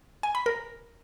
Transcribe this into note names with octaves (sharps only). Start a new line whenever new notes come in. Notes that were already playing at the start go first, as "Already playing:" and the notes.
G#5
B5
A#4